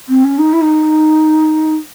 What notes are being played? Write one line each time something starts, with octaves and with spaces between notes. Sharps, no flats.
C4
C#4
D#4
E4
D#4